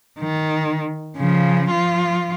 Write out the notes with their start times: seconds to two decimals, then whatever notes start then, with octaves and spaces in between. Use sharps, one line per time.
0.19 D#3
1.16 C#3 F3
1.70 F3 F4